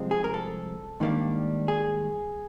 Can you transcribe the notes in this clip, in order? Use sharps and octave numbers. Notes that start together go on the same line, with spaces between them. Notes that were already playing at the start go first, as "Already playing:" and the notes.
Already playing: C2 C3 F3 G#3 C4
G#4
A#4
A4
G#2 D#3 G3 A#3 D4
G#4